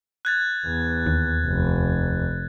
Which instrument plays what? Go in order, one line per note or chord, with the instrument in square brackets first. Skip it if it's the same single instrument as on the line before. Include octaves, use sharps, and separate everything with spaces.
[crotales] F#6 G#6 A6
[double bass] E2
[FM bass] D#2
[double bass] F1